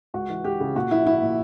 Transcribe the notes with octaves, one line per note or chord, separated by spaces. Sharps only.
C#2 F#4
E3
C#2 G4
C#3
A#2 F#4
A#1 E4
A#1 E4
A#2